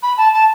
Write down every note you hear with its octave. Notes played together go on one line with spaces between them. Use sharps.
B5
A5
A5